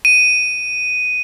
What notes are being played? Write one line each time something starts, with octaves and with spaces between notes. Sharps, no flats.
D#7